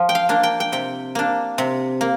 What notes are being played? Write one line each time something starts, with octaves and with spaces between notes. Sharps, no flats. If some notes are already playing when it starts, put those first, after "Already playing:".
Already playing: F3
G5
F5
A#3 D4
G5
G5
C3 G5
A#3 D4
C3
A#3